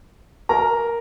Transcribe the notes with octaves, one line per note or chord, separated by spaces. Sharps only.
A#4 A#5